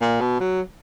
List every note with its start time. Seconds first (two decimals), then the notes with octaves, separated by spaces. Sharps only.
0.01 A#2
0.21 B2
0.40 F#3